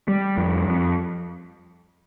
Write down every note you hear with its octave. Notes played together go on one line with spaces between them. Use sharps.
G3
F2
F2